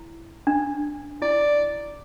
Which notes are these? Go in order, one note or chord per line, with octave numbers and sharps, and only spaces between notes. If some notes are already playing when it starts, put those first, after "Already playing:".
Already playing: E4
D4
E4 D5